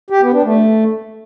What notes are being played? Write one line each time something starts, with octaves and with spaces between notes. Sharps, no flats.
G4
B3
D4
A3